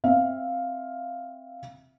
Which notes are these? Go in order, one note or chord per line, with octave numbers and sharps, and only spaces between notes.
C4 E5 F5